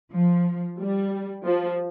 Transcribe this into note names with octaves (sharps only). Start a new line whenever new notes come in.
F3
G3
F3